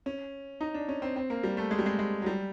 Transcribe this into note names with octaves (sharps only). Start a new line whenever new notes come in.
C#4
D#4
D4
C#4
C4
C4
A#3
G3
A3
G#3
G3
G#3
G#3
F#3
G3